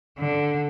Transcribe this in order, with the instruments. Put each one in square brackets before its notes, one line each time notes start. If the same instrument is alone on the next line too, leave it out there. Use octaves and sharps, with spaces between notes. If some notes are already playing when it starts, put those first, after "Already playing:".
[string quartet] D3